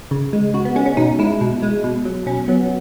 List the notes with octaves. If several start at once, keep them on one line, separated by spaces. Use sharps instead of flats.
C#3
G#3
C#3 F#4
B3
G#3 C#4
C#4
B2 D#4
G#3 E4
B2
G#3
B2
F#3
B2 C#4
F#3 B3